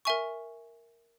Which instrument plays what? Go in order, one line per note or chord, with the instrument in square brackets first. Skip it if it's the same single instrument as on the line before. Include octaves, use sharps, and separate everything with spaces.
[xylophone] A#4 E5 G#5 C#6